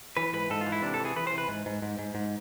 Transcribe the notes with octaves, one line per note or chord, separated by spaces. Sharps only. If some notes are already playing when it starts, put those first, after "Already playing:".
E3 B4
G#2 B4
G#2 A4
F4
E3
E4
C3 D4
A4
E3
G#4
E3 B4
C5
C3
B4
G#2
G#2
G#2
G#2
G#2